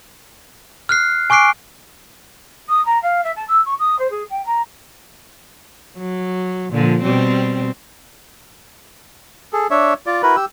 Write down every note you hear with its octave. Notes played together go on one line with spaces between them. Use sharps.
F6 F#6 C7
G#5 C#6 D6 F#6 C7 D7
D#6
A#5
F5
E5
A5
E6
C#6
D#6
C5
G#4
G5
A#5
F#3
A#2 D3 F3
B2 G3 C4
G#4 A4
D4 C#5 E5
F4 D5
E4 F#4 A#4 B4
G4 E6